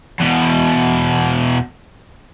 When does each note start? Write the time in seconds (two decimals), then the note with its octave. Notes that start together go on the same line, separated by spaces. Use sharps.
0.20 E2 B2